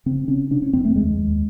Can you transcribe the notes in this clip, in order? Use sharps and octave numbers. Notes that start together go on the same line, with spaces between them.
C#3 C4
C#3 C#4
C3 D4
C#4
F2 C4
A3
D#2 G#3
D#2